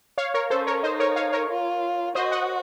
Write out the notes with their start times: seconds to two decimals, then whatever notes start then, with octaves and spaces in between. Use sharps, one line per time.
0.18 C#5 F5
0.34 A#4 C#5
0.50 C#4 A4 C5
0.67 A#4 C#5
0.83 D#4 C5 D#5
1.00 A#4 C#5
1.16 C#5 F5
1.32 A#4 C#5
1.49 F4
2.15 F#4 C5 D#5
2.31 D#5 F#5